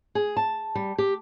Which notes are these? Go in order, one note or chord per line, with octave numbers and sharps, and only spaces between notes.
G#4
A5
G3
G4